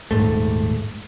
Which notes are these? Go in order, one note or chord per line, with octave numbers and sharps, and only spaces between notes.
D#1 C#2 G#2 A3